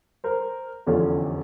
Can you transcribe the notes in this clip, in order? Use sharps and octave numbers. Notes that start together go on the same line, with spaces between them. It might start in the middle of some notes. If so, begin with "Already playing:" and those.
A#4 C5
F1 E2 D3 C#4 F4